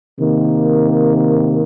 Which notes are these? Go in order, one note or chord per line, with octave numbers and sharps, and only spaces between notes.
C3 D#3 A#3